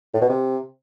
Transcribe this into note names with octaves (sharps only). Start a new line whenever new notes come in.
A2
B2
C3